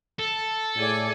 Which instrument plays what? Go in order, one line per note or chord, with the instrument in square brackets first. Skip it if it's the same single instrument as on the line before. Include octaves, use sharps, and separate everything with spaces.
[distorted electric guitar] A4
[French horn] A2 [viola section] G#4 D5 G#5